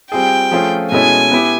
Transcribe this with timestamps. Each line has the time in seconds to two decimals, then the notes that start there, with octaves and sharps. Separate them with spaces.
0.11 G3 C4 F4 G#4 G5
0.51 F3 A3 C#4 F4 G#4
0.92 B2 G#3 C#4 E4 A4 G#5
1.31 B3 E4 G4